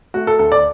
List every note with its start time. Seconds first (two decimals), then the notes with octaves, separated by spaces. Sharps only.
0.14 A3 F#4
0.27 A4
0.39 D2 A4
0.52 D5